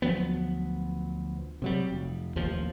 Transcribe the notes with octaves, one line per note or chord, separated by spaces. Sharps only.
D2 F3 F#3 B3
C3 F#3 G3
F1
A1 D#2 F3